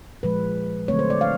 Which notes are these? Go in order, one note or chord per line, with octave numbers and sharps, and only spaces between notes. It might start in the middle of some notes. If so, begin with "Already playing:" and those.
A#2 F3 G#3 B4
D3 F#3 A3 C4 C#5
C5
D5
F5